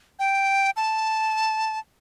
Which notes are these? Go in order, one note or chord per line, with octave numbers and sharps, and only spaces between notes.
G5
A5